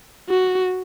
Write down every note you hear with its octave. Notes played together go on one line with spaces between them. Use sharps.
F#4